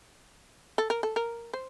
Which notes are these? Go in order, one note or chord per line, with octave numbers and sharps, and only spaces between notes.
A4
A#4
A4
A#4
C5